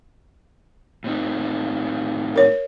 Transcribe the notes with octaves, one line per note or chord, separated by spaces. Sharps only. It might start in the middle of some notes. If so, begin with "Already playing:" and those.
A2 C4 D#4
A#4 C#5